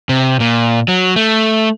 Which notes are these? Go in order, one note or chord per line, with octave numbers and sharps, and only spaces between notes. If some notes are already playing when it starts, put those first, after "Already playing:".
C3
A#2
F#3
A3